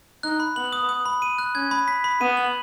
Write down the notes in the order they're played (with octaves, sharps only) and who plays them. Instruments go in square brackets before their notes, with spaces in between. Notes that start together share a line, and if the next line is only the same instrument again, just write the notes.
[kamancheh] D#4 [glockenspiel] F#6
[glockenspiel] B5
[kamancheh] B3 [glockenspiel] F#7
[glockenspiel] D#6
D#6
B5
D#7
F#6
[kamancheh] C#4 [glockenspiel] G#6
[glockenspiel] B5
B6
B5
[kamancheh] B3 [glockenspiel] D#7
[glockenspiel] F#7